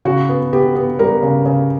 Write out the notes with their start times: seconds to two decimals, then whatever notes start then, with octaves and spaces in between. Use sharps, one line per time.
0.05 C#3 F#4
0.29 B3
0.53 B3 G4
0.75 B3
0.99 G3 A#4
1.23 C#3
1.46 C#3